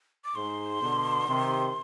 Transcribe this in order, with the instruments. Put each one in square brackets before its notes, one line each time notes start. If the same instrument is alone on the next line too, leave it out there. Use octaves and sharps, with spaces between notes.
[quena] D6
[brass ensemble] G#2 [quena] C6
[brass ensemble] B2 D3
C3 D#3